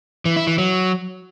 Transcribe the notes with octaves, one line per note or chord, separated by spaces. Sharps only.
E3
E4
E3
F#3